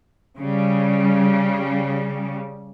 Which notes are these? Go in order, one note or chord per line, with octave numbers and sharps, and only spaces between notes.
C#3 G3